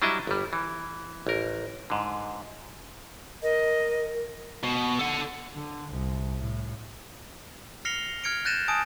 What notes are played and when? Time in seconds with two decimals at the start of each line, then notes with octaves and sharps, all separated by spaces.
0.02 F#3 G3 D4 E4 D#5 E5
0.27 G1 G3
0.53 E3
1.27 A1 A#4
1.90 G#2 D3
3.43 A#4 D#5
4.63 B2
4.99 A4 F#5
5.55 D3
5.94 C2
6.39 A2
7.85 F6 A#6 C7 C#7 F7 G7
8.24 F6 G#6 C#7 D7
8.45 F#6 G6 A6 A#6 D#7 E7
8.68 G#5 A5 D#6 D7